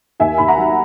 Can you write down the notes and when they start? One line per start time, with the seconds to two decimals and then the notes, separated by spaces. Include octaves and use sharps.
0.20 D#2 E5 G#5
0.38 D#2 B5
0.48 F#5 A#5
0.57 F#3